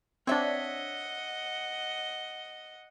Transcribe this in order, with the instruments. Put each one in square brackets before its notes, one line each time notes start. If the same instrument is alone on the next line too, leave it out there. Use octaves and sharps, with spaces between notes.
[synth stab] C4 D4 [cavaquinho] C#5 E5 [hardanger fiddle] D#5 F#5